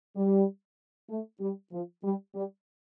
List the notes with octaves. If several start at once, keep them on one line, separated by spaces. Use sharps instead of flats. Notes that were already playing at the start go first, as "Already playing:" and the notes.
G3
A3
G3
F3
G3
G3